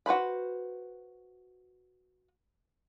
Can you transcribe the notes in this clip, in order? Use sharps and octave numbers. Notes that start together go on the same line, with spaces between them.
F#4 B4 C5 B5